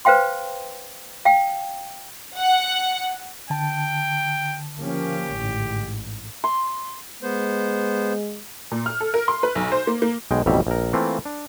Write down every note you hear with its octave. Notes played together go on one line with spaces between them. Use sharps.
B4 C5 F5 G5 C6
F5 G5
F#5
D3 G5 A5
F3 A#3 C#4 G4
A1 G#2
C6
G#3 B3 C5
A#2
F6
A4
A#4
C6
B4
B1
C5
A#3
A#3
B1 B2 G#3 G5
A1 F2 B2 G3 E5 A#5
A#1 A#4
E3 A3 A#3 C4 F4
D4